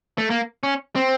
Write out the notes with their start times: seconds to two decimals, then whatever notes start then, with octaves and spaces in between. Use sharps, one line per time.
0.18 A3
0.30 A#3
0.63 C#4
0.96 C4